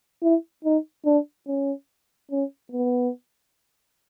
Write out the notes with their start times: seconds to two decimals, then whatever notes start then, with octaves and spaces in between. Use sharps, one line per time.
0.23 E4
0.65 D#4
1.06 D4
1.48 C#4
2.31 C#4
2.72 B3